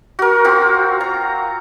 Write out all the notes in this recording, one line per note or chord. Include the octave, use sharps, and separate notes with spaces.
F#4 A#4
C4 F4 F#4
A#5